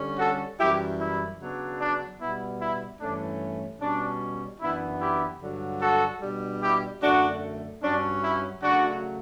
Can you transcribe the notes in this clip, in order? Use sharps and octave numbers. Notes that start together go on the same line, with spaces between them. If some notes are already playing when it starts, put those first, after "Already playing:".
Already playing: D3 G3 C#4
F#4 A4
F#2 E3 G3 E4 G4
E4
C#3 F#3 B3 D4
D4
B2 G3 B3 E4
E4
G2 E3 A3 C#4 D4
B2 G3 C#4 D4
F#2 E3 B3 D4 E4
E4 G4
G2 D3 F#3
F#4 A4
B2 G3 D4
E4 G4
F#2 D3 A3 D4 F#4
G2 F#3 C#4 D4
E4
C#3 F#3 A3 D4 F#4